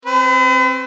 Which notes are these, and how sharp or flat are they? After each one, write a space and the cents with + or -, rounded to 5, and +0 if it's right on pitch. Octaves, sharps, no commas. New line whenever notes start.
C4 +15 B4 +45